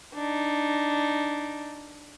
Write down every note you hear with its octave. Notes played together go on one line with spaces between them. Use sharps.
D4 D#4